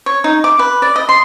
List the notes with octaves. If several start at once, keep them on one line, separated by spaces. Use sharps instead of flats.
C#5
D#4
D6
B4
D5
D#5
C6